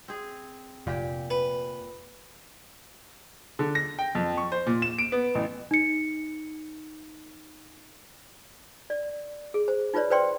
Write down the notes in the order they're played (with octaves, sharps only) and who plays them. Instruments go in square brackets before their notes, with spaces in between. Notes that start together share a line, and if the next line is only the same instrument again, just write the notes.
[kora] C4 G#4
[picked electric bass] F1 [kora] A#2 G4
[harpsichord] B4
[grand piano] D3
A#6
G5
F2
C#6
C5
A#2
E7
D7
B3
A1
[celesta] D#4 C#7
[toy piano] D5
G#4
C5
D#4 F4 B4 C#5 D5
B4 C5 D5 G5 C6